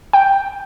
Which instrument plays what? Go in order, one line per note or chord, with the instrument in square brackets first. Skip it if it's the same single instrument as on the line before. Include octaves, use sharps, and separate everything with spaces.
[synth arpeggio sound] G5